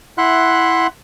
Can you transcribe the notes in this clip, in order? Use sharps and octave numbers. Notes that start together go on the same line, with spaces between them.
E4 E5 F#5 C6 F#6